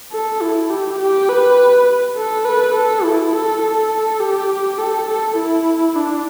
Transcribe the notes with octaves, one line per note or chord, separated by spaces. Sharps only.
A4
E4
G4
G4
B4
A4
B4
A4
E4
A4
A4
G4
A4
A4
E4
D4